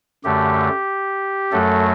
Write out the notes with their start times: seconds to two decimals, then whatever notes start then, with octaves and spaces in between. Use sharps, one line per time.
0.24 F#2 D3 A3 G4
1.52 F#2 F#3 A3 A4